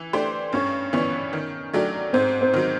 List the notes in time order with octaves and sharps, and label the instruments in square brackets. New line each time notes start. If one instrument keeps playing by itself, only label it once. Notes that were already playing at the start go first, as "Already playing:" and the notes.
Already playing: [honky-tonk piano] E3
A3 D4 G4 C5
[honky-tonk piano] G2 [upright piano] C#4
[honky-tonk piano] E3 G3 B3 [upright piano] C#4
[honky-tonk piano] D#3
F#3 A3 D4 G4
[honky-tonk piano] G#2 [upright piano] C4
[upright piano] C4
[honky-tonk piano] D#3 F#3